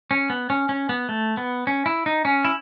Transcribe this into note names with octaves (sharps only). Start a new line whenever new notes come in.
C#4
B3
C#4
C#4
B3
A3
B3
C#4
E4
D#4
C#4
E4